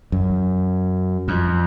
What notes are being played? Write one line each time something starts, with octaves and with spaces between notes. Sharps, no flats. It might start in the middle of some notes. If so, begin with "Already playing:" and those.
F#2
F2